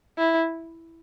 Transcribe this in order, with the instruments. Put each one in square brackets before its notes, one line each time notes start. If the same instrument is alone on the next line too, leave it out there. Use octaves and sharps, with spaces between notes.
[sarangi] E4